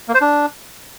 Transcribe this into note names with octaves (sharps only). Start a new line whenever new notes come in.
A#3
C5
D4